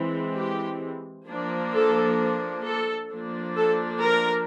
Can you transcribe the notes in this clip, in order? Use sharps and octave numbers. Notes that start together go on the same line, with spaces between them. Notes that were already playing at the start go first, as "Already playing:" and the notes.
Already playing: E3 G#3 C4
G4
F3 A#3 D4
A4
A4
F3 A#3 D4
A4
A#4